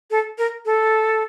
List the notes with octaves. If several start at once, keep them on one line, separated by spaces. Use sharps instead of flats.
A4
A#4
A4